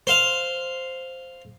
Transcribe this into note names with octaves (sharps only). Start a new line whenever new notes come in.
C5 F5